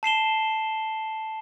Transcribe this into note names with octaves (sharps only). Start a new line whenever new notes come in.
A5 C7 E7 G7